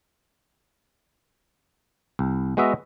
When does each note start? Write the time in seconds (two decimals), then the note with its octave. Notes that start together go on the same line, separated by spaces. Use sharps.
2.19 C2
2.57 G#3 B3 F#4 D#5 E5